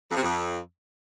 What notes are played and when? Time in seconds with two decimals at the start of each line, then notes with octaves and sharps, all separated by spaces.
0.10 F2
0.16 C3
0.22 F2